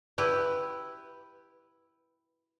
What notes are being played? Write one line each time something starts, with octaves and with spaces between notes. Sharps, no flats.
E4 G4 B4